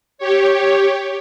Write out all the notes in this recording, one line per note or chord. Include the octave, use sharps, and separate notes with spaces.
G4 C#5